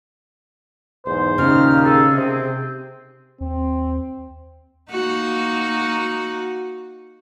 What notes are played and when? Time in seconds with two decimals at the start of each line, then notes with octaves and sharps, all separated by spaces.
1.06 B1 E2 G#2 C5
1.38 D#2 A#2 C#3 D#4 F6
1.85 G#4 A4
2.15 C3 C4
3.41 D#2 C4
4.91 A#3 D#4 F#4